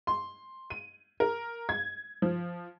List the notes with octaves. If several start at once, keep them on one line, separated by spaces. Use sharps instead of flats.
C6
D#7
A#4
G#6
F3